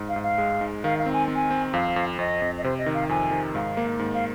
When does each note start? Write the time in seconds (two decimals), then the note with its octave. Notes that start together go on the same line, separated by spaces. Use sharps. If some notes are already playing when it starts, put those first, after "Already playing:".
Already playing: G#2
0.09 F5
0.16 G#2
0.23 F5
0.38 G#3
0.61 G#2
0.84 D#3 F5
0.99 F5
1.06 C4
1.13 G#5
1.28 C4
1.35 G#5
1.51 C4
1.73 F2 F5
1.96 F2
2.19 F2 D#5
2.42 F2
2.58 D#5
2.64 C3 C5
2.78 D#5
2.86 D#3
2.94 F5
3.09 F2 G#5
3.31 D#3
3.55 G#2 F5
3.77 A#3
3.99 G#2
4.14 F5